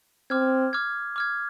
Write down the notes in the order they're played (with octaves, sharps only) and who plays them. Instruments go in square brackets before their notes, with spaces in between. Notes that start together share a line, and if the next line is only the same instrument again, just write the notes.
[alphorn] C4 [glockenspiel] D6 F6 G#6
[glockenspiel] D6 F6 G#6
D6 F6 G#6